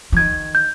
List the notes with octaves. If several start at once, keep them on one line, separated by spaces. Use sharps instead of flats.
F3
D#3 G#6
G6